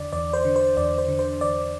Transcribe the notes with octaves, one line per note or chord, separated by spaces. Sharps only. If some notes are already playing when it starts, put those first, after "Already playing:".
Already playing: E2 D3 D5
E2 D5
C5
D3
C5
E2 D5
C5
D3
C5
E2 D5